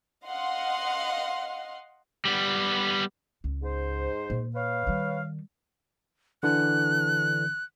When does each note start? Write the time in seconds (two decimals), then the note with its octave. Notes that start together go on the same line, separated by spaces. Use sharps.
0.25 D#5 F5 F#5 C6
2.25 G3 B3
3.44 C#2
3.63 G#2 C5
4.30 A#2
4.55 B4 C#5 F5
4.87 D#3 G3
6.43 D3 E3 D4 F#6